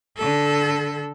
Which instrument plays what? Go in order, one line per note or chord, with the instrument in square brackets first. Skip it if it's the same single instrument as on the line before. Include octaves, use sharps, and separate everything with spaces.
[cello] D3 A4